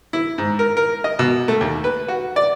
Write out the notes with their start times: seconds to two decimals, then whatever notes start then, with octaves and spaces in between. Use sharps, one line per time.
0.13 E4
0.38 G#2
0.59 A#4
0.77 A#4
1.04 D#5
1.19 B2
1.48 A3
1.61 D#2
1.84 B4
2.08 F#4
2.36 D5